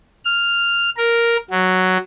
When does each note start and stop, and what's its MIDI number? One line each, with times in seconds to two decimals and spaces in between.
0.25 0.90 89
0.97 1.37 70
1.50 1.97 54